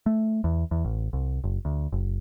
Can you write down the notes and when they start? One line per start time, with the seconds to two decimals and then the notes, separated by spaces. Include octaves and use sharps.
0.06 A3
0.44 E2
0.71 E2
0.84 A1
1.13 C2
1.44 F#1
1.65 D2
1.92 F#1